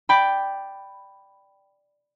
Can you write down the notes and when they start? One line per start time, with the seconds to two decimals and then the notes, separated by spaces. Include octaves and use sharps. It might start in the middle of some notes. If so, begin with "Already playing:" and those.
0.09 D5 G5 B5